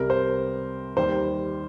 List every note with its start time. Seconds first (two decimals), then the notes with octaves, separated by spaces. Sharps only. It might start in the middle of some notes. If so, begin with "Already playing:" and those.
Already playing: C2 C3 G3 A#4
0.10 C5
0.96 D#2 D#3 G3 C5